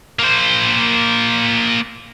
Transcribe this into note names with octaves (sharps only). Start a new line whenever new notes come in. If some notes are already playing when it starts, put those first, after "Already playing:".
A#3 C5